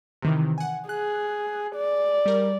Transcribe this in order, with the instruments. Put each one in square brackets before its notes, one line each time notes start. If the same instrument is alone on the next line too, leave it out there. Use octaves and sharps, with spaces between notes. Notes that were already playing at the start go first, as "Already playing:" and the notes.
[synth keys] C3 D#3 E3
F#5 G#5
[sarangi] G#4 [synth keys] F#6
[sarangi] D5
[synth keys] G3 A#4